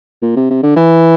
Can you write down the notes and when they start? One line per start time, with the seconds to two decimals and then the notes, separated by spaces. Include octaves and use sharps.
0.22 A#2
0.36 C3
0.50 C3
0.63 D3
0.76 E3